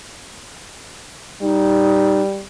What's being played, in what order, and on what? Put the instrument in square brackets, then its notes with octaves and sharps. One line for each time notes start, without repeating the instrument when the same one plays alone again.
[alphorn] G3 [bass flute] D#4